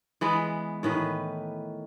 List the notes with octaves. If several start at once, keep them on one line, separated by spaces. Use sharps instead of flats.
E3 G#3 B3
A2 D#3 E3 B4